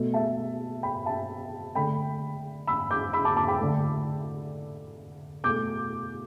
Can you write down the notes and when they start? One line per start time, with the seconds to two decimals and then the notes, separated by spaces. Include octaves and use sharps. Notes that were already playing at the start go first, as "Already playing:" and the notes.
Already playing: B2 A3
0.14 E5 A5
0.83 G5 B5
1.06 E5 A5
1.75 D3 A3 G5 B5
2.67 B5 E6
2.91 D6 G6
3.13 B5 E6
3.25 A5 D6
3.36 A5 D6
3.48 G5 B5
3.60 D3 A3
5.44 B2 A3 D6 G6